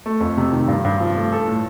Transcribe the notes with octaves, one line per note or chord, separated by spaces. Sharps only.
A3
F2
C3
D#3
G2
G2
F3
A3
A4
A2